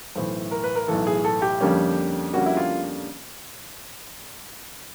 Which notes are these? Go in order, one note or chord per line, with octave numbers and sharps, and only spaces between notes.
B1 A2 E3 C5
A#4
B4
A#4
B1 A2 E3 A4
G#4
A4
G4
F2 D3 G3 A#3 C#4
F2 D3 G3 A#3 C#4 F#4
E4
F4